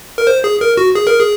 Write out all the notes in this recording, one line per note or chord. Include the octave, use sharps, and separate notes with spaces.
A#4
C5
G#4
A#4
F#4
G#4
A#4
G#4